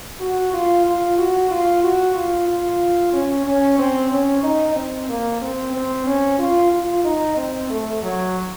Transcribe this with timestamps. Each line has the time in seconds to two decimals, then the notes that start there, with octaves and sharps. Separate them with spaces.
0.21 F#4
0.53 F4
0.86 F4
1.18 F#4
1.51 F4
1.83 F#4
2.15 F4
2.48 F4
3.13 C#4
3.45 C#4
3.79 C4
4.11 C#4
4.43 D#4
4.76 C4
5.09 A#3
5.41 C4
5.73 C4
6.06 C#4
6.39 F4
6.72 F4
7.04 D#4
7.37 C4
7.70 A3
8.02 F#3